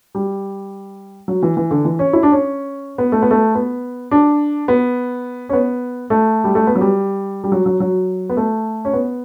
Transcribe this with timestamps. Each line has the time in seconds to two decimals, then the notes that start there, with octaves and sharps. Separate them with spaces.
0.15 G3
1.28 F#3
1.43 E3
1.57 E3
1.71 D3
1.85 E3
1.99 C#4
2.13 E4
2.23 D4
2.32 C#4
2.98 B3
3.12 A3
3.22 B3
3.31 A3
3.55 B3
4.11 D4
4.68 B3
5.49 C#4
5.53 B3
6.10 A3
6.44 G3
6.55 A3
6.67 B3
6.76 F#3
6.81 G3
7.44 G3
7.52 F#3
7.66 F#3
7.80 F#3
8.29 B3
8.37 A3
8.85 C#4
8.93 B3